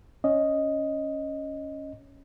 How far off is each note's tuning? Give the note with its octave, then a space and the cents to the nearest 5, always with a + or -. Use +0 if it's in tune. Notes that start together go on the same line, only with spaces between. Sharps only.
C#4 +0 D#5 +0